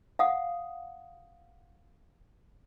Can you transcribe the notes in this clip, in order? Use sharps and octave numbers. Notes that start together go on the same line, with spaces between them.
F5 F#5 D#6